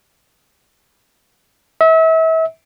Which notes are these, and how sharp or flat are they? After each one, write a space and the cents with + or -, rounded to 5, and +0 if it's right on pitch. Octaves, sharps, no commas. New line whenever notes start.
E5 -35